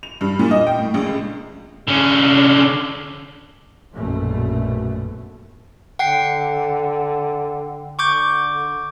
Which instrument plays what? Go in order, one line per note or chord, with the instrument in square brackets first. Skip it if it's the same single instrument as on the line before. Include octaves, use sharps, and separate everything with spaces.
[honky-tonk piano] F7
G2
A#2
D#5
G5
A2
A#1
C#2
[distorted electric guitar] D3 C#4
[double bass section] A#1 F#2 B2 A3
[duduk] D3 [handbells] F#5 G5 C7
[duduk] D3 [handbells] C#6 D6 G6